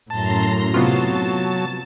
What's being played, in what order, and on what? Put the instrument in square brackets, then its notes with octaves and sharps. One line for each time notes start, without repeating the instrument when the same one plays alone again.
[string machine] F#2 A#5 C6 [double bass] A2 [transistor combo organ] A5
[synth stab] C3 B3 F4 [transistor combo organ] F#3 [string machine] A5